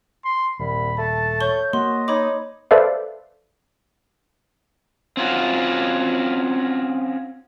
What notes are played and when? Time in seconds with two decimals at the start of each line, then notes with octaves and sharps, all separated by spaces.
0.25 C6
0.59 D#1 C2 B5
0.98 A3 A5
1.41 C#5 C#6 G6 G7
1.73 A#3 F#4 D#5 C6
2.08 D#4 C#5 B5 D6
2.71 A4 B4 C5 D5 E5 F5
5.17 C4 C#4 F4 F#4